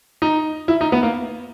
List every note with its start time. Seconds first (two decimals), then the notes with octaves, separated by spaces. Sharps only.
0.22 D#4
0.68 E4
0.81 D#4
0.92 B3
1.03 A#3